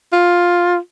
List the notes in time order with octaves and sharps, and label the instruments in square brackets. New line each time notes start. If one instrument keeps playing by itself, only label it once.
[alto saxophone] F4